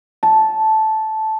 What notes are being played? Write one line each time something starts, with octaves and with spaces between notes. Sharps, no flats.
A5